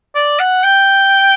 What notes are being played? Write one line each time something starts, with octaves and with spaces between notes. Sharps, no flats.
D5
F#5
G5